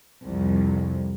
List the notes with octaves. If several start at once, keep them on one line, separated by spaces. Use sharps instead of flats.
C2 F2